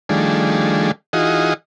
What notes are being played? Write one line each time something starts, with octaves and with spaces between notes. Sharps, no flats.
D#3 F3 G3 A3 D4 G#4
E3 D#4 F4 F#4 G#4 D#5